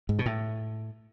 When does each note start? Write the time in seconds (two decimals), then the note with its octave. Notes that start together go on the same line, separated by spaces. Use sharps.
0.09 G#2
0.19 B2
0.26 A2